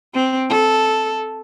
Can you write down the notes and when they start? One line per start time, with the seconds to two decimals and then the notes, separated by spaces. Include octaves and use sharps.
0.14 C4
0.49 A4